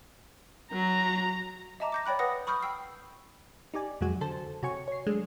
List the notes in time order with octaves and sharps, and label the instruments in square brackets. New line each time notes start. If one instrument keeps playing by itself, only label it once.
[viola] F#3 [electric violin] A#5
[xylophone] D#5 E5 A5 A#5 D6
D6 G6 A#6
C#5 D5 G5 B5 F#6
B4 D5 F#5 D#6 A#6
B5 C#6 D#6 F6 G6
G5 E6 C7
[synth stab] D#4 G4 D5 G#5
F2 C3 F#3 G#3 F#4 G#5
D3 A4 C5 A5
C3 F#4 C#5 G#5 C#6
C#5 C7
F#3 G#3 A3 D4 G#4